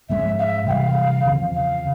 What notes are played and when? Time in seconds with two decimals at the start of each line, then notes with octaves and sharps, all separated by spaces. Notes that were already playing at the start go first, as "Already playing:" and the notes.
0.09 G#2 F3 G#3 C#4 E5
0.38 F5
0.42 E5
0.67 C3 E3 G3 F5 G5
1.25 E2 C#3 F3 C4
1.54 F5